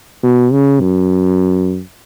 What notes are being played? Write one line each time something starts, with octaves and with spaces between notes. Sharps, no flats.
B2
C#3
F#2